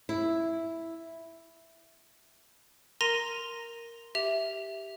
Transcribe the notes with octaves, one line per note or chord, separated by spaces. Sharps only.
E4
A#4 A#5 C6 A#6 D#7 F7
G4 E5 F7